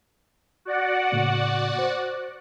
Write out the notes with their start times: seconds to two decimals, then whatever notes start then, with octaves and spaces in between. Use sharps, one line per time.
0.65 F#4 D5 F#5
1.12 A2 C#3 A#3
1.79 C5